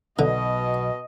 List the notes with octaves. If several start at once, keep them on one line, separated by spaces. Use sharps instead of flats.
B1 B2 D3 D#5